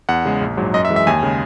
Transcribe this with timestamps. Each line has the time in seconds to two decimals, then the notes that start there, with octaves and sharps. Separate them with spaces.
0.09 E2 F#5
0.25 C#3 G#3
0.41 A#1
0.57 G#2 F#3
0.74 F#2 D#5
0.85 E5
0.90 E3 G#3
0.96 E5
1.07 D#2 G#5
1.23 C#3 G#3